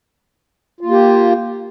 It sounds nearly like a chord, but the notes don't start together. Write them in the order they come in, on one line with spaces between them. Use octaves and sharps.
F4 A#3 G4